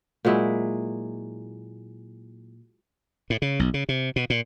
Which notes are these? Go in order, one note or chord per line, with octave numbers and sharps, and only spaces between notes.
A#2 F#3 G#3 E4
A2
C#3
B1
C#3
C3
B2
A#2